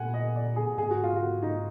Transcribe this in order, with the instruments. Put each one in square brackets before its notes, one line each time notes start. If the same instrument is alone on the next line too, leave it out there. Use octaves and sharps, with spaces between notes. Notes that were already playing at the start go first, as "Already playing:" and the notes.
Already playing: [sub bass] A#2 [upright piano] F#5 G#5
[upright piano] D#5
D5
G#4
[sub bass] G#2 [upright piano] G#4
[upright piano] F#4
F4
F#4
D#4